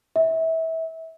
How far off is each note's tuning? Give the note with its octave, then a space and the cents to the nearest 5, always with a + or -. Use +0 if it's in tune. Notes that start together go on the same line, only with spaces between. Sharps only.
E5 -25